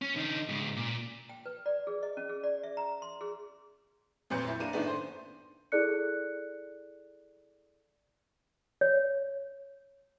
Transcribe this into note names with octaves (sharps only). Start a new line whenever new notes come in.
C#4
D3 D#4
G#2 C#3
A#2
G5
B4
D5
G#4
D#5
C#4
G#4
D5
E5
A#5
C6
G#4
F2 A#2 F#3 B4 G6 C#7
E4
A#3 D4 D#7
F#2 A2 D#3 A3 B3 D4
C5
E4 G#4 A4 D5 F#6 C#7
C#5